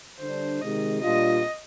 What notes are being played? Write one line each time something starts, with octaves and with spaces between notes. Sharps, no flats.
D3 G3 D4 C5
C3 D#3 G#3 D#4 D#5
A#2 G3 D4 F4 D#5